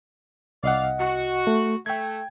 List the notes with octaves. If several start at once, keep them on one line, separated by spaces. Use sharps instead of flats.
C2 D5 D#5 F5 F#5
F#4
A3
A3 G5 G#6